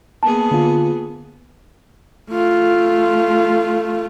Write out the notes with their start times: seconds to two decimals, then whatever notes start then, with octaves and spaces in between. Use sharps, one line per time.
0.23 A#3 B3 G#4 A5
0.51 D3 F4
2.31 A3 F4